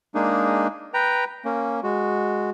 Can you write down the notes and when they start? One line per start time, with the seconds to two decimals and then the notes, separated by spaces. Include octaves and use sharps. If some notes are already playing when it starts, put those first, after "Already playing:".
0.15 G#3 A#3 D4 D#4 G#4
0.94 B4 G5 A#5
1.45 A#3 C#4
1.83 G#3 F#4